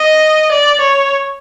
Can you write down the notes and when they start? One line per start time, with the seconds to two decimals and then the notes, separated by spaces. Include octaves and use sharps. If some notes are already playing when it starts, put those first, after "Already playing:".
Already playing: D#5
0.52 D5
0.81 C#5